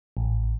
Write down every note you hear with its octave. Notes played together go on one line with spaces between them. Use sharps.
A1